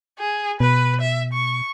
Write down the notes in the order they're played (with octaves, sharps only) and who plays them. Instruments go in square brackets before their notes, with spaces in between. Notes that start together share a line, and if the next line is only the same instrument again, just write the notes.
[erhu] G#4
[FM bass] B2 [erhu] B4
[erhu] E5
C#6